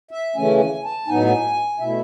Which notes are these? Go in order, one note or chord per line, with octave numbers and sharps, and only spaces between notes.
E5
C#3 E3 A3 C#4 G#5
G#5
A5
A2 F#3 B3 D#4 G#5
B2 A3 E4 E5